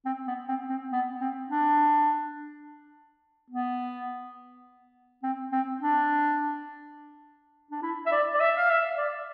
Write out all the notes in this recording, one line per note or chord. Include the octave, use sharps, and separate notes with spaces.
C4
B3
C4
C4
B3
C4
D4
B3
C4
C4
D4
D4
E4
E5
D5
D5
E5
F5
E5
D5